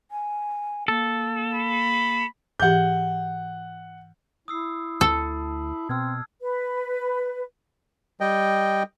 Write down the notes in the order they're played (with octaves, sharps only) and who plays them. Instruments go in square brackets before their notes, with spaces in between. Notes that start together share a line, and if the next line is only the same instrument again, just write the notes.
[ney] G#5
[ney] A#3 [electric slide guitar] A4
[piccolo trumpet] B5
[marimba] G#2 E3 G4 [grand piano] F#5 G6
[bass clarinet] E4 [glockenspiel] D#6 E6 C7
[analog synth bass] D2 [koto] A4 [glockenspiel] A5
[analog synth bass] B2 [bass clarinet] C4 [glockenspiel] E6 F6 G#6
[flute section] B4
[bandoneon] G3 D#5 G5